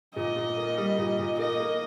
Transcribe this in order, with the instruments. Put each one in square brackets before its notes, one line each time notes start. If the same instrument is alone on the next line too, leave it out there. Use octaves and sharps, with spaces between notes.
[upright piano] A#2 [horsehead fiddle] D#5
[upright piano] A#2
A#3
G3
A#2
A#2
[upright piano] A#3 [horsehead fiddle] D#5
[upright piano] A#3